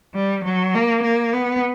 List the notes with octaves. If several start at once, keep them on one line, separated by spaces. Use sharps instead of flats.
G3
F#3
A#3
A#3
B3